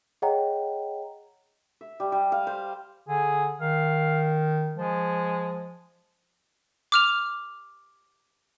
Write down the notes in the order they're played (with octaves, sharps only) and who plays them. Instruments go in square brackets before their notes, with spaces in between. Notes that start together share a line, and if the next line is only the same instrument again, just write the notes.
[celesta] G#4 C#5 D#5 F#5 G5 A#5
[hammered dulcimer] E5
G3
G3
F5
C5
[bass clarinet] D3 [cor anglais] G#4
[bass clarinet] D#3 [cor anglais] F5
[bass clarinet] F3 [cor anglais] G#3
[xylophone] D6 F6 F7